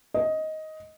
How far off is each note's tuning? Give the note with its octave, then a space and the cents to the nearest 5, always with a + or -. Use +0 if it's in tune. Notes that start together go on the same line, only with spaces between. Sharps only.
D#5 +10